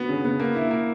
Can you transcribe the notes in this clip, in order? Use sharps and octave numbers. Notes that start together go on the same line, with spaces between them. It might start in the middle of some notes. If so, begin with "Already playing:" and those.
Already playing: B3 F#4
C#3
B3
A#3
E4
A#3